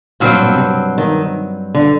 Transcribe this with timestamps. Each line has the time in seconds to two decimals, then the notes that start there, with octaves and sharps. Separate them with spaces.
0.20 G2 A#2 F#3 C4
0.38 A#2
0.54 C3
0.98 D#3
1.75 D3